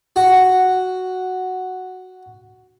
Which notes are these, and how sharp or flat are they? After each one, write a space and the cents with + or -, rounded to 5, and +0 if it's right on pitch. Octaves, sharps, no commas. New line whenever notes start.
F#4 +0